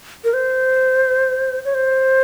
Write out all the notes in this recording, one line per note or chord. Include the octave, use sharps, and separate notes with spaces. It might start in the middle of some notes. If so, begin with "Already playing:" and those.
A#4
C5
C#5
C5